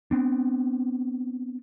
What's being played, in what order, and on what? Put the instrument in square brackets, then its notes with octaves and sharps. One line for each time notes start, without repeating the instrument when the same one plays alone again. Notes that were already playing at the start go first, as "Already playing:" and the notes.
[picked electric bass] B3 C4 D4